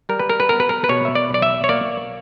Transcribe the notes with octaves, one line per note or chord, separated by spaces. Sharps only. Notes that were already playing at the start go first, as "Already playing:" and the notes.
G3 A#4
B4
A#4
B4
B3 A#4
B4
A#4
B4
B2 C#5
E5
D5
B1
D5
E5
C#5
A#3 D5